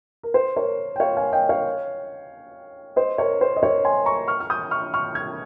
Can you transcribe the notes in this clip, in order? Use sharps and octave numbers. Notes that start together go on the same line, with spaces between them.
A#4
C5
A#4 C#5
G5
C#5 F5
F5 G#5
D#5 G5
C#5 F5
C5 D#5
A#4 C#5
C5
D#5
A#4 C#5
G#5 C6
A#5 C#6
C#6 F6
F6
D#6 G6
C#6 F6
C#6 F6
F6 G#6